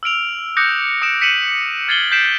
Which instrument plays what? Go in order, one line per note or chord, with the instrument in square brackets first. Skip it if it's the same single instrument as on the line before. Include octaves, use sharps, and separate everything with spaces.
[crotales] E6 F6 D7 F7
D6 D#6 F#6 G6 A#6 C#7
D#6 C#7 D7 E7
B6 C#7 D#7 E7 F#7
F6 G#6 A6 C7 F#7 G7
G6 B6 C7 D7 E7